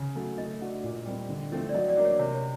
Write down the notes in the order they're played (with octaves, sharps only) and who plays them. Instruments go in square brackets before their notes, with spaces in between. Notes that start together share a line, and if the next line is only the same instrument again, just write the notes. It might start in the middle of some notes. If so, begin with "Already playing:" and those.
Already playing: [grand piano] C#3
F#3 A3
[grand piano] A3 [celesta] D#5
[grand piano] D4 F#4
A#2
G3 C4
D3
F3 A3 C4 F4
[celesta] D5
[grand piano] F#3 [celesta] D#5
[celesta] D5
[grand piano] A#3 D4
[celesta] C#5
[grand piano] C3 [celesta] C#5
[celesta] C#5